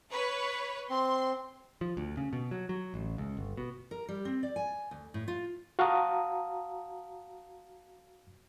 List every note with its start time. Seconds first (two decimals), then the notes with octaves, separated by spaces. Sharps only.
0.11 B4 C#5
0.90 C4 C6
1.81 F3
1.97 D2
2.17 C#3
2.33 B2
2.51 F#3
2.69 F#3
2.94 A1
3.18 C#2
3.37 G1
3.57 B2
3.91 A#4
4.09 G3
4.25 C4
4.43 D5
4.56 G#5
4.91 D2
5.14 A2
5.28 F4
5.79 F#4 F5 A5 A#5 D#6